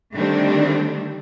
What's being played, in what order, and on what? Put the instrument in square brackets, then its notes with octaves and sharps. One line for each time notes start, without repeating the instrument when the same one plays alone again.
[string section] D3 D#3 G3 A3 C4 D4